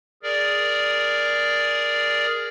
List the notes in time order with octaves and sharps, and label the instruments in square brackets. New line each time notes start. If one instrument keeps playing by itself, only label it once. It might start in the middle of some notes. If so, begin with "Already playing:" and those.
[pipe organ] G#4 A#4 D5